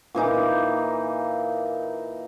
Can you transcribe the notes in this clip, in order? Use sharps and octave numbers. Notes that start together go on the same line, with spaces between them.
A#2 E3 D#4 D6